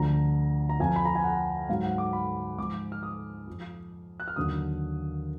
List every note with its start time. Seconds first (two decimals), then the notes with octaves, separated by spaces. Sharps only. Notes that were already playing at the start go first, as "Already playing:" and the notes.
Already playing: D2 D3 F3 A#5
0.69 A#5
0.80 F2 F3 G#5
0.96 B5
1.05 A#5
1.15 G#5
1.24 F#5
1.69 G#2 F#3 F5
1.83 F#5
1.98 D6
2.13 B5
2.58 G#2 F3 D6
2.92 F6
3.03 D#6
3.47 F2 F3
4.20 F#6
4.28 F6
4.36 D#2 D3 F#3 D#6